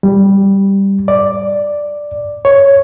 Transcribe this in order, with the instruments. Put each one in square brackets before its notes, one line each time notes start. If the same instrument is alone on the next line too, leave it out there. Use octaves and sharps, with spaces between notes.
[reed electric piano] G3
D5
C#5